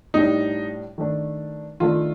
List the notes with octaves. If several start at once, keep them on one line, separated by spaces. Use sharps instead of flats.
A2 G3 D4 D#4
D#3 A3 D4
D#3 A3 D4 F4